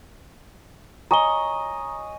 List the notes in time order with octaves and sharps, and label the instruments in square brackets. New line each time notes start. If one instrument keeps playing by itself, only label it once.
[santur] C#5 D#5 G#5 [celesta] A#5 G7